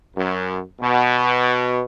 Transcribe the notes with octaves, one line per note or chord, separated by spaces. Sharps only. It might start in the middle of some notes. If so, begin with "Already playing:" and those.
F#2
B2